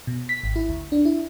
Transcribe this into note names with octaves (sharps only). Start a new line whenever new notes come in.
B2
B6
G#1
E4
D2
D4
E4